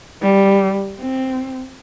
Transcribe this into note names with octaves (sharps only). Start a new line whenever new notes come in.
G3
C4